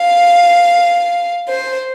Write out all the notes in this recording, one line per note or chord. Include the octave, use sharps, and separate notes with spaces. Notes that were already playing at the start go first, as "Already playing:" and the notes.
Already playing: F5
C5